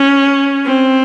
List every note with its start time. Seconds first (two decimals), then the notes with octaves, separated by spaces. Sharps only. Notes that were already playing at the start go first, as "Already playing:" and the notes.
Already playing: C#4
0.65 C4